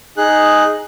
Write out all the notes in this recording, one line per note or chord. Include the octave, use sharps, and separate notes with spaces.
D#4 G#4 F#6